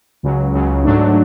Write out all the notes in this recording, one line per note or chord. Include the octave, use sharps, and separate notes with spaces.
C#2 C#3 F#3
C#2 C#3 F#3
G#2 F#3 A3 D4